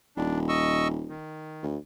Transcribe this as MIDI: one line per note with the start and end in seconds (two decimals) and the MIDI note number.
0.17 1.15 27
0.17 0.39 62
0.49 0.88 75
0.49 0.88 85
0.49 0.88 88
1.09 1.65 51
1.63 1.77 38